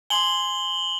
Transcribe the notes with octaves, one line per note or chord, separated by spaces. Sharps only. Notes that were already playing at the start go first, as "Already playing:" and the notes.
G#5 C6 F#7 G7